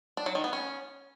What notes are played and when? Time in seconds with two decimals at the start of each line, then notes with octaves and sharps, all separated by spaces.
0.17 D4
0.26 F#3
0.35 D#3
0.44 B3
0.53 C#4